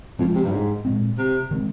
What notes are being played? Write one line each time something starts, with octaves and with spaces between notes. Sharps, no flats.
F2 F3 G#3 C#4
C3
G2
G#2
A#2 G#3 C4
C3
D#3 G#3 C4